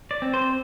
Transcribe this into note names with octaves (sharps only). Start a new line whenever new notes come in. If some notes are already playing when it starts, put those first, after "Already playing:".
D5
C4
C5